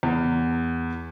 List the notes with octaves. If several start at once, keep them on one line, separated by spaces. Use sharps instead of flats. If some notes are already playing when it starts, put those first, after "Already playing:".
E2